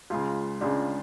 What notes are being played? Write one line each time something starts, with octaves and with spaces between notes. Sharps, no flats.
C#2 C#3 F4
C#2 C#3 D4